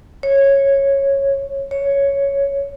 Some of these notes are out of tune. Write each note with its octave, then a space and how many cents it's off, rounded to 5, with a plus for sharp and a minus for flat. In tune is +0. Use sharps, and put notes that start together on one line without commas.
C#5 -10
C#5 +5